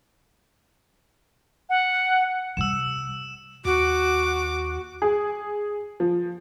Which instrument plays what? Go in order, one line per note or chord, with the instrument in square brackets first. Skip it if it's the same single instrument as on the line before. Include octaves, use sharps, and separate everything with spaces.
[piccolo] F#5
[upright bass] C3 G3 [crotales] E6 E7
[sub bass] D#2 [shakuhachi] F#4 [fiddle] D6
[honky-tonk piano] G#4
F3